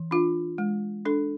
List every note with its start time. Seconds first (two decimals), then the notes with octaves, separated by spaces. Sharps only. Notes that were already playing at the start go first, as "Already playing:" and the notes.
Already playing: E3
0.11 D4 F4
0.58 G#3
1.05 D4 A4